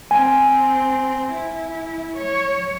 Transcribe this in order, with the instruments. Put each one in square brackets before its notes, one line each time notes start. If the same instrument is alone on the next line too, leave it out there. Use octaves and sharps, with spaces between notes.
[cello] C4 [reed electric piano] G#5
[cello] E4
C#5